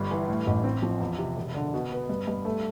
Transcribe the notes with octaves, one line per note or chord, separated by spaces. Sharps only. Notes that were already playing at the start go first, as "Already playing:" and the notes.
Already playing: G1 G2
E3
A2
A1
C4
F3
E2
C3
E1
D3
B2
B3
G2
G2
A3